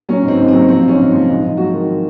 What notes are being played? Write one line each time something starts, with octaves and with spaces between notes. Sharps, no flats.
F#3 C#4
G#2 C4
G#2
C4
F#3
F3 C4
G#2 C#4
G#2
F3
G#2
G#2
F#3 F#4
D#3